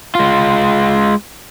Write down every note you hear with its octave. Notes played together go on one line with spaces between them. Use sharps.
G#3 F4